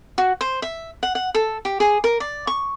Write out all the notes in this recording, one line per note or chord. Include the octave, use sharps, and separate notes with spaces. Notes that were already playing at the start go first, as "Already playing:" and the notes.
F#4
C5
E5
F#5
F#5
A4
G4
G#4
A#4
D5
C#6